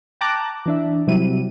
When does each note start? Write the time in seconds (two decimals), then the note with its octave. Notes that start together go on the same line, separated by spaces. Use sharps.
0.21 G5 A5 A#5 D6 F#6
0.66 E3 D4 E5
1.07 C3 F#3 G3 E4 D#7